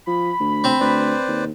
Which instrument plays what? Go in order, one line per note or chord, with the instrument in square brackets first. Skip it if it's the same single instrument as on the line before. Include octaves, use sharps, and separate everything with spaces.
[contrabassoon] F3 [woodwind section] B5
[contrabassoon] D2
[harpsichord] C4
[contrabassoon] D2 [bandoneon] B4 C5 D5
[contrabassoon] D#2